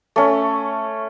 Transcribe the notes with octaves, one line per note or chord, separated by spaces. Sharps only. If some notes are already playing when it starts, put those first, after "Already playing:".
A3 C#4